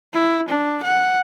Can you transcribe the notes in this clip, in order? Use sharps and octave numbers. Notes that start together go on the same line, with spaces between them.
E4
D4
F#5